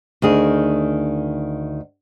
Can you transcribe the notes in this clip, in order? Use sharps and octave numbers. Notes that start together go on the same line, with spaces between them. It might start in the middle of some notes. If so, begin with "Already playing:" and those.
D2 D#3 G#4